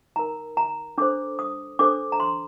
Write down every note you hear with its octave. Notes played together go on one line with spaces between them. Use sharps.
D#4 A#4 A#5
A#5
D4 A4 C5 D6
D#6
D4 A4 C5 D6
A#5
C6